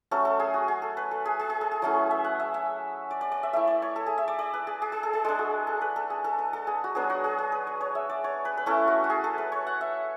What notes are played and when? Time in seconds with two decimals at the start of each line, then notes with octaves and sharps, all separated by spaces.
0.11 F#3 A3 C#4 A4
0.25 A4
0.39 G#4
0.54 F#4
0.68 G#4
0.82 A4
0.97 B4
1.11 A4
1.25 G#4
1.39 G#4
1.50 G#4
1.61 A4
1.71 G#4
1.82 F#3 A3 C#4 E4 G#4
2.11 E5
2.24 F#5
2.40 E5
2.54 E5
3.11 D5
3.21 D5
3.32 D5
3.43 E5
3.53 A3 E4 E5
3.67 D5
3.82 C#5
3.96 A4
4.06 G#4
4.18 E5
4.28 D5
4.39 D5
4.54 B4
4.67 G#4
4.82 G#4
4.92 G#4
5.03 A4
5.13 G#4
5.24 G#3 D4 G#4
5.39 F#4
5.67 A4
5.81 B4
5.96 A4
6.10 G#4
6.24 A4
6.39 B4
6.53 A4
6.67 G#4
6.84 F#4
6.95 F#3 B3 D4 G#4
7.10 F#4
7.24 G#4
7.38 G#4
7.52 B4
7.67 C#5
7.81 C#5
7.95 E5
8.10 D5
8.24 C#5
8.45 B4
8.57 B4
8.66 A3 C#4 E4 A4
8.88 F#4
9.04 F#4
9.10 G#4
9.24 A4
9.38 B4
9.52 C#5
9.67 F#5
9.81 E5